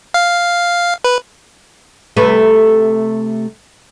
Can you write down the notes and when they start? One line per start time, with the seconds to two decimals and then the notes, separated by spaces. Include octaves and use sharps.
0.14 F5
1.04 B4
2.17 C3 A3 B4